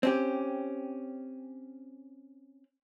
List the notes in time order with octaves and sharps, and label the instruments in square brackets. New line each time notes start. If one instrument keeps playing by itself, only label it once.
[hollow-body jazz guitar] C4 C#4 G4